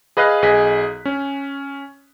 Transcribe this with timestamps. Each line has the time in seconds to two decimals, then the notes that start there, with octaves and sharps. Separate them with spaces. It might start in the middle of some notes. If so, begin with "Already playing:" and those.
0.17 G#4 B4 D#5 F5 F#6
0.42 B1 G#4 D#5 B6
1.05 C#4